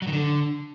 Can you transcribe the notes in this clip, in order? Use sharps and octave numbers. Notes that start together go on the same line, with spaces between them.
F#3
D#3
D3